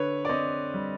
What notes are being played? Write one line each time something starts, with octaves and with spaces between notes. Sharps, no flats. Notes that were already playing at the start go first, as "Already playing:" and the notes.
Already playing: D3 B4 C#5
D5
C4 C#5 D#5
G3